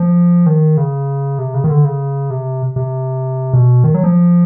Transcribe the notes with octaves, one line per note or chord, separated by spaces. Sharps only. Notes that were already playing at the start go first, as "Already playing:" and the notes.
Already playing: F3
D#3
C#3
C3
C#3
D#3
D3
C#3
C3
C3
B2
D#3
F#3
F3